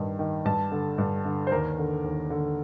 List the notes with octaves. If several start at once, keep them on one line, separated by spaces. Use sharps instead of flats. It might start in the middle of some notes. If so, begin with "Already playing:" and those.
Already playing: G2 D#3
D#3
G2 A5
D3
G2
D3
C5
D#2 A#4
D3
D#2
D3